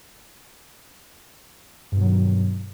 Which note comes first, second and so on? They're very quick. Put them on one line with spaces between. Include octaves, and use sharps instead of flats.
G2 B2 F#3 D#3